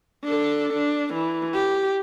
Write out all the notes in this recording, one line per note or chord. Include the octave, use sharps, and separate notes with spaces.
D4 A4
D4
E3
G4